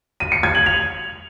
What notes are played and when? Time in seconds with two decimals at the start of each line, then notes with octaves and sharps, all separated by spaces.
0.20 D#7
0.32 C#7
0.43 G#6
0.55 F#7
0.66 F7